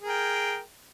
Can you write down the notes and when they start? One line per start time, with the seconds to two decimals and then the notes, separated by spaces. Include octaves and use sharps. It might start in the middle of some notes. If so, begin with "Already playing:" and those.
0.01 G#4
0.05 A#4
0.09 G5